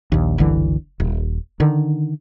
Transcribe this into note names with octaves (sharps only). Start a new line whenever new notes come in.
A#1 D#2
F#1 C2 D3 E3
D#1
D3 D#3